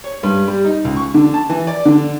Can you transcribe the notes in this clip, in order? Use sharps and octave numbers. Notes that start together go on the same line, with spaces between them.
C#5
G2
G3
D#4
C#2
C#6
D3
A5
E3
D5
D3